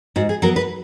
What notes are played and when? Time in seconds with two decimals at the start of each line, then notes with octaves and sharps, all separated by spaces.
0.16 G#2 F#4
0.29 G#4
0.42 F#3 B3 A#4
0.56 B4